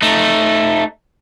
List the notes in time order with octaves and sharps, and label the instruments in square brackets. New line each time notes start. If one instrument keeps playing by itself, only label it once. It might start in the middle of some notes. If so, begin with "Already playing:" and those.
[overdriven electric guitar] A3 D#4